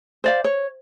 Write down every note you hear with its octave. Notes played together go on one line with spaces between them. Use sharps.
C5 D5 F5
C#5